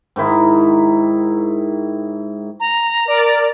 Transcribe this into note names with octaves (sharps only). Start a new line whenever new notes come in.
G#2 D#3 E4
A#5
A#4 D5